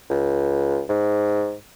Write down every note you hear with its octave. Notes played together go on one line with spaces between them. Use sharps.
C#2
G#2